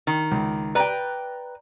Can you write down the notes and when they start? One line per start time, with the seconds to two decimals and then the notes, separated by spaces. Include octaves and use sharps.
0.07 D#3
0.31 C#2
0.75 B4 D5 G5 A#5